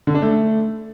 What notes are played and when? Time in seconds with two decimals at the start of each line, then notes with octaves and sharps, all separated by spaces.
0.07 D3
0.15 D4
0.22 A3